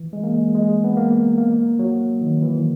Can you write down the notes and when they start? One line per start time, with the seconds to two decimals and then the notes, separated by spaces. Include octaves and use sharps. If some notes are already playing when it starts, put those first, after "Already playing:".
Already playing: E3
0.13 G#3
0.24 A#3
0.34 G#3
0.55 G#3
0.84 B3
0.97 A#3
1.38 A#3
1.79 F#3
2.21 D#3
2.42 E3